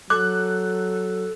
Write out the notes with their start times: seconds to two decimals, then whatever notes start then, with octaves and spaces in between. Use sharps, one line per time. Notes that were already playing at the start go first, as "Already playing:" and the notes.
0.10 F#3 A4 D6 F#6